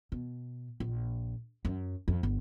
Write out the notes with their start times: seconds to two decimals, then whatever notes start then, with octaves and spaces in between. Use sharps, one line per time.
0.12 B2
0.80 A#1
1.65 F#2
2.08 F2
2.23 G1